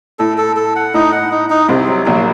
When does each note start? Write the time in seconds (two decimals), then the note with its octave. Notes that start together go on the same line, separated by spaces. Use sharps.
0.19 A2 A4
0.38 A4
0.56 A4
0.76 F#5
0.94 A2 D#4
1.12 F#5
1.31 D#4
1.50 D#4
1.69 C2 C3 C4
1.88 F#3
2.06 A#1 A#2 F#3